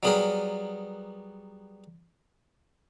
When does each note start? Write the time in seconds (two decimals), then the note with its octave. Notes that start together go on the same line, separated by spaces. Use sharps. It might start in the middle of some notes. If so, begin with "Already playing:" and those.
0.03 F#3 G3 B3 G#4 A#4 B4